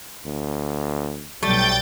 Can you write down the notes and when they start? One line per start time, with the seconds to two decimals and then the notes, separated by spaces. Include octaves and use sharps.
0.25 D2
1.43 B1 F#3 G3 A3 G5 G6 A6